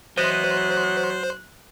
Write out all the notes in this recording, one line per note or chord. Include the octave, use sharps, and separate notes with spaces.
E3 F#3 B3 C5 D#5 F#6